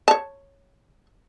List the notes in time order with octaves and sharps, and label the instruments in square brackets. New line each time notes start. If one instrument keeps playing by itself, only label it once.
[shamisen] C#5 A5